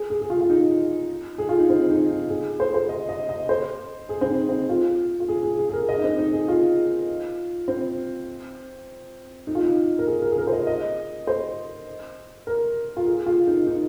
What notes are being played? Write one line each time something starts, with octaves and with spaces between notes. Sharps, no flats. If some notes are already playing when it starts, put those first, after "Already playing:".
Already playing: G#4
G#4
G#4
F4
F4
D#4
G#4
F4
D#4
C4
D#4
D#4
G#4
C5
C5
D#5
D#5
D#5
C5
G#4
C4
D#4
C4
F4
F4
G#4
G#4
G#4
G#4
A#4
D#5
D#4
C4
D#4
G#4
F4
C4
D#4
F4
D#4
A#4
G#4
A#4
G#4
A#4
C5
D#5
D#5
C5
A#4
F4
G#4
F4
D#4
D#4